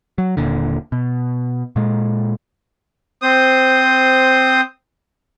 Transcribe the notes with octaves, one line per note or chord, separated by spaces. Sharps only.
F#3
D#1 A#2 D3
B2
A#2 G#3
C4 C5 D#6